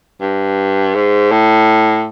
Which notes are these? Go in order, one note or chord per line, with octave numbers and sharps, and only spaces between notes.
G2
G#2
A2